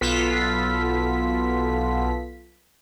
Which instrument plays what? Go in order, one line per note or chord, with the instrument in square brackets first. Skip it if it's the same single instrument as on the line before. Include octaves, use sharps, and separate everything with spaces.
[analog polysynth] B1 B3 F4 A4 B6